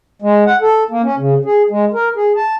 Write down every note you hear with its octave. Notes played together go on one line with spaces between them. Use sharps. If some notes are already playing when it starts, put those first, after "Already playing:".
G#3
F#5
A4
A#3
C#4
C#3
G#4
G#3
A#4
G#4
A5